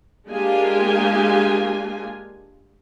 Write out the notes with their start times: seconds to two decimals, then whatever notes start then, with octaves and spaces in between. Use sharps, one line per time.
0.28 G#3 A#3 D4 F4 G4 G#5